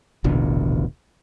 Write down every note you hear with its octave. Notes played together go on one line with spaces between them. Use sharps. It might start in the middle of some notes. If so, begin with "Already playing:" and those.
D#1 A1 B2 D3